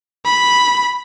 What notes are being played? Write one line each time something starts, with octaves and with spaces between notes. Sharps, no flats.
B5